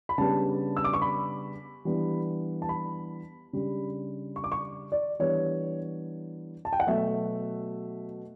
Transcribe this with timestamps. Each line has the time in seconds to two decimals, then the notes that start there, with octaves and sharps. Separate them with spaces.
0.09 B5
0.18 C#3 G3 B3 D4 A5
0.76 E6
0.84 D6
0.93 C#6
1.02 B5
1.85 E3 G3 B3 D4
2.62 A5
2.69 B5
3.53 C#3 G3 D4
4.36 C#6
4.44 D6
4.52 C#6
4.92 D5
5.19 E3 G3 B3 D4 C#5
6.65 A5
6.73 G5
6.80 F#5
6.87 B2 F#3 A3 E5